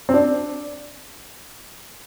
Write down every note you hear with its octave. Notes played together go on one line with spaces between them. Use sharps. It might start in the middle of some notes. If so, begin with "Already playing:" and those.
C4
D4